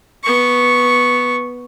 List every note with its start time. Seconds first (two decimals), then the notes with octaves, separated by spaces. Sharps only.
0.24 B3 C#6